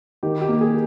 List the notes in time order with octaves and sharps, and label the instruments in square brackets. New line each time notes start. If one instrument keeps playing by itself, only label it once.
[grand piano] D#3 G4
G4
A#3
G#4